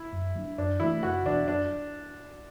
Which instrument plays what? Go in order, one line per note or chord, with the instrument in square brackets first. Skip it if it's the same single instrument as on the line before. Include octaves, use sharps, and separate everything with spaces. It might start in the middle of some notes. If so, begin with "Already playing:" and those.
Already playing: [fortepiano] E4
[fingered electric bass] F#2
F#3 A3 D4
[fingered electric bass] F#2 [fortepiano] D4
[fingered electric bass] E3 A3 [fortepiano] E4
[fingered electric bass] F#1 [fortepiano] F#4
[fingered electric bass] E2 B2 [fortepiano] D4
[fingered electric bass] F#2 [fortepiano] D4